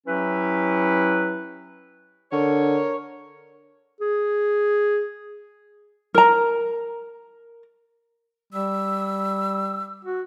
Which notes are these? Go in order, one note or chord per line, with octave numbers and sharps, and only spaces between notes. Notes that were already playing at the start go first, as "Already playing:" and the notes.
F#3 C#4 E4 G4 B4
D3 A#4 C#5
G#4
A#4 A#5
G3 E6
F#4